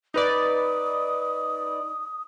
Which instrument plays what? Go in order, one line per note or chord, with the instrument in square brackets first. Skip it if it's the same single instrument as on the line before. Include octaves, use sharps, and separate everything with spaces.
[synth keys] D#4 B4 D5 [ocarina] D#6